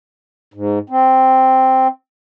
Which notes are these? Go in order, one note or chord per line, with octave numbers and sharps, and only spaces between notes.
G#2
C4